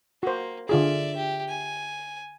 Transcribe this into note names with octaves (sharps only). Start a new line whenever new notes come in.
A#3 F#4 C5
D3 F4 G#4 D5 E5
G4
G#5